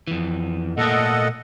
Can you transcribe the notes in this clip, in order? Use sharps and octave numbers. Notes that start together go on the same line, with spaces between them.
F2 E3
A#2 A3 A#3 A4 D#5 F#5